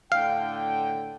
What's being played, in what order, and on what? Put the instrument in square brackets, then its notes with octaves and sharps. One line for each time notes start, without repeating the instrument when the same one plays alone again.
[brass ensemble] A2 D3 G5 [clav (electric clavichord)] F5